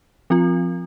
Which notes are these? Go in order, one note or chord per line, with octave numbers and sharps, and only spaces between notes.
F3 C4 F4